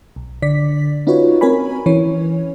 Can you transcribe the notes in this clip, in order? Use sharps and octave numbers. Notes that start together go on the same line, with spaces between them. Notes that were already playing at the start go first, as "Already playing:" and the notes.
B1
D3 D5 B6
C#4 D#4 F4 F#4 B4 C#5
C4 A#4 C#5 G#5 B5
E3 C#4 C#5